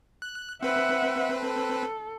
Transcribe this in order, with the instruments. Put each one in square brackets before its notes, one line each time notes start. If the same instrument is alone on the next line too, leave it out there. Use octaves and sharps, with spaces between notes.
[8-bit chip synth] F#6
[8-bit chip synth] C4 B4 [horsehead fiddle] E5 F#5
[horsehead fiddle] A4